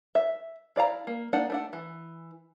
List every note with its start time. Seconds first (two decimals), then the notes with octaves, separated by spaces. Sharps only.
0.15 E5
0.76 E4 D5 F5 A#5
1.07 A#3
1.33 A#3 D4 D#4 F#5
1.50 A3 D4 F#5
1.73 E3